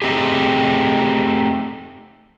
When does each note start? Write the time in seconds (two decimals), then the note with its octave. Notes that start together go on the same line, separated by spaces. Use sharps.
0.02 A3 C4 D#4 G4 G#4